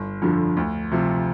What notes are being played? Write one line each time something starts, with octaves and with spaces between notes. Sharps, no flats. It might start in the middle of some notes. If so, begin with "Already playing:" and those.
Already playing: G1
F2 D3 F3
D2
C3 F3